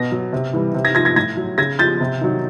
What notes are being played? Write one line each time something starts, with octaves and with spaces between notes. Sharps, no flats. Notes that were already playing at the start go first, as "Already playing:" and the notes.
Already playing: B2 A#6
F#3
C3
E3 G3
C3
G#6 A#6
F3 G#6 A#6
G#6 A#6
A2 G#6 A#6
F#3
C#3 G#6 A#6
F3 G6 A6
C3
D#3 F#3